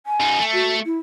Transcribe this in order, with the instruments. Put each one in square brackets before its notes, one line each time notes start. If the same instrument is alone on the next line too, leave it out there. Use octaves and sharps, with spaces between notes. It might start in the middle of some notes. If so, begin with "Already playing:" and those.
[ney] G#5
[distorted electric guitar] F#2 D#4
A3
[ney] F#4
E4